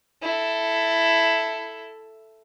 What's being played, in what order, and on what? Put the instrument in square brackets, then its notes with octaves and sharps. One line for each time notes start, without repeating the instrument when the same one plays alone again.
[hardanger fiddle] E4 A4